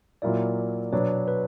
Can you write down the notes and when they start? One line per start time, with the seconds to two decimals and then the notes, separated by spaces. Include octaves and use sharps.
0.22 A#2 F#3 A#3 E4 D5
0.92 B2 F#3 B3 D4 C#5
1.28 B4